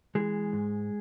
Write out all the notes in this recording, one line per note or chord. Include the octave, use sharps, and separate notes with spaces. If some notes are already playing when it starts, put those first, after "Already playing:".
E3 G#3 G#4
G#2